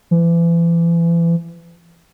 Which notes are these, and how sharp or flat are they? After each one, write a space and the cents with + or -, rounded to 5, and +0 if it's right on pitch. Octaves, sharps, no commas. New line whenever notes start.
E3 +35